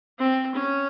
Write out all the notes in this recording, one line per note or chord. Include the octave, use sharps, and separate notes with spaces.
C4
C#4